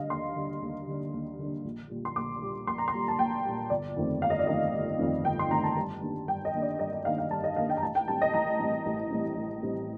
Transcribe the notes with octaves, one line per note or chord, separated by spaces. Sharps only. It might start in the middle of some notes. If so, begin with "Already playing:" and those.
Already playing: D3 G3 D4 D#5 F5
D#2 C6
D3 G3 D4
D#2
D3 G3 D4
D#2
D3 G3 D4
A#1
A#2 G3
C6
A#1 D6
A#2 G3
A#1 C6
A#5
C6
A#2 G3
A5
A#1 G5
A#2 G3
G1 D5
F2 D#3 A3 C4
G1 F5
D#5
D5
F2 D#3 A3 C4 D#5
G1
F2 D#3 A3 C4
G1 G5
C6
F2 D#3 A3 C4 A#5
A5
G2
D#3 A#3 D4
G2 G5
D#5
D#3 A#3 D4
D5
G2 D#5
D#5
D#3 A#3 D4 F5
F5
G2 A5
D#5
D#3 A#3 D4 F5
G5
A#5
A1 A5
G5
A2 G3 C4 A5
D#5
A1 A#5
A2 G3 C4
A1
A2 G3 C4
A1
A2 G3 C4